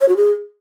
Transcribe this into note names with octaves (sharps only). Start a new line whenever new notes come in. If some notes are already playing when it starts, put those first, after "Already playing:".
C#5
F#4
G#4